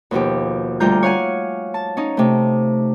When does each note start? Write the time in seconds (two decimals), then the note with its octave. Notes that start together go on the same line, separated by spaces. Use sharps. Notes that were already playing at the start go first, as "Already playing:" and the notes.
0.11 D#2 B2 F3 G4
0.80 D2 G3 F4 A#5 G6
1.03 C#5 F5 F#5 G#5
1.74 A5
1.97 C#4 D#4
2.17 C3 A3